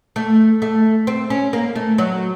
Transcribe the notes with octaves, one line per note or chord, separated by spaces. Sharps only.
A3
A3
C4
C#4
A#3
A3
F#3